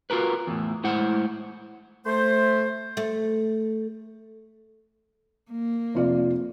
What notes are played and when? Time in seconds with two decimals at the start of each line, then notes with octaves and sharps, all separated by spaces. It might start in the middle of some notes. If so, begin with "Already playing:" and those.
0.10 F4 F#4 A#4 B4
0.47 E2 A2
0.84 A2 G#3 E4 C5 F#5
2.06 A3 C5
2.97 A3
5.51 A#3
5.95 F1 F4 D5